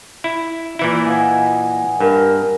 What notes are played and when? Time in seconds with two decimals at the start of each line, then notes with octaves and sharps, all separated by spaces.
0.24 E4
0.79 A#2 E3 E4
1.05 D#5 F#5 G#5
2.00 G2 A#4